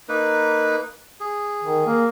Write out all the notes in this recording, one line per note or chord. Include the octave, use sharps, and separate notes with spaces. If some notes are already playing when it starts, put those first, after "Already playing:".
A#3 D#4 B4
G#4
D#3
A#3